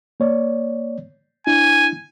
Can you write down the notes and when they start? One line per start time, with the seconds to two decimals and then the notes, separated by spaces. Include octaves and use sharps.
0.20 A#3 C#5 D5
1.47 D4 E4 G#5